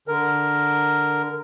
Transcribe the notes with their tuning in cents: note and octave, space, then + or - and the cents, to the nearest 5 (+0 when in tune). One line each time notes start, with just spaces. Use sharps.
D3 +0 A#4 +0